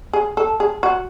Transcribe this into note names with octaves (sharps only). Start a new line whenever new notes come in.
G#4
A4
G#4
F#4